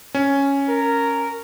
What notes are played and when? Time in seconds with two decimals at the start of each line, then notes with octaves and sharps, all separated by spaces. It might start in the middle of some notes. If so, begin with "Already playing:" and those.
0.15 C#4
0.69 A#4